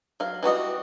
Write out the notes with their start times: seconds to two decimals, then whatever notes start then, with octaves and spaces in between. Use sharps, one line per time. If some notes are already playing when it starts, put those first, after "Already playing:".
0.20 F#3 F5
0.43 E3 G3 F#4 D#5